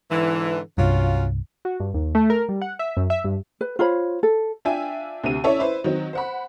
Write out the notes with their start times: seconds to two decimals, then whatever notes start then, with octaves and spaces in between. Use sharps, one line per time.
0.10 G#2 D3 E3
0.78 C2 G2 F#3 C#4 F4
1.65 F#4
1.80 G2
1.94 D#2
2.15 A3
2.30 A#4
2.49 G3
2.62 F#5
2.79 E5
2.97 F#2
3.10 E5
3.24 G2
3.61 B4
3.79 F4 C5 C#5 B5
4.23 A4
4.65 D4 F4 E5 G5 G#5
5.24 D2 C3 D#7
5.44 C#4 E4 A4 C#5 D5 E5
5.59 E4 B4 C5
5.84 D#3 F#3 C4
6.13 C5 F#5 B5